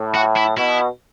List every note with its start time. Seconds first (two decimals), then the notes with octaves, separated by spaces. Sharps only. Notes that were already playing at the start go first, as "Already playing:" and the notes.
Already playing: A2
0.15 F#4
0.36 E4
0.57 B2 E4